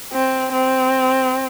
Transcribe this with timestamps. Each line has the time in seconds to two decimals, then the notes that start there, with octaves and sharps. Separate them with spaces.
0.13 C4
0.52 C4